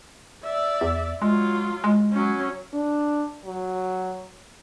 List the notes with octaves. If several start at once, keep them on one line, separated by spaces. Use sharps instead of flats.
D5 E5
E2
F#3 G#3 F4
G#3
F#3 C#4
D4
F#3